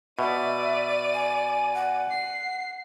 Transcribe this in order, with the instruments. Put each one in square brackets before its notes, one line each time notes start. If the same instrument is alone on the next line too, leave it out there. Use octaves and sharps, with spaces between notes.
[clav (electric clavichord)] B2 [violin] D5 D#7 [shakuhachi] E5
[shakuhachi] G#5
F#5
[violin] C7